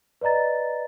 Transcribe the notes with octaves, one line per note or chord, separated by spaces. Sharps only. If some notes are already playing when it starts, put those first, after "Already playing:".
B4 D5 D#5 A#5 A6